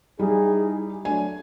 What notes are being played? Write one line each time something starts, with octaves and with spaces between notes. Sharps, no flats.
G3 D#4 E4 G#4
F#3 A3 D4 G#5